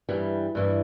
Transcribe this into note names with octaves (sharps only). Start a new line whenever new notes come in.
G2 E3 G3
G2 E3 G3